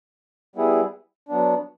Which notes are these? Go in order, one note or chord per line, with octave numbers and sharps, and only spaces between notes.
G3 B3 E4 G#4
F#3 B3 D4